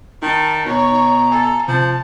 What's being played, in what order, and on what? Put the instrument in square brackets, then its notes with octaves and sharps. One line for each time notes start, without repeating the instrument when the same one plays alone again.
[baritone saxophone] D#3 [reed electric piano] D#4 [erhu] A5
[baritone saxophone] B2 [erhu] C#5 [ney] A#5
[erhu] A4 [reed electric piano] G#5
[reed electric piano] C3 [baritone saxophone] F3 [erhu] A5